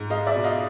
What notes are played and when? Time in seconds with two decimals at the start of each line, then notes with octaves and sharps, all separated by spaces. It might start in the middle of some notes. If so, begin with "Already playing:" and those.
Already playing: G#2
0.10 G#3 D#5 F5
0.27 D5 E5
0.35 B2
0.44 D#5 F5